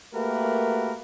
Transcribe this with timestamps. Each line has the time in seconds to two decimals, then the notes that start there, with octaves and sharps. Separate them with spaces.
0.14 A3 A#3 F#4 G4 A#4 B4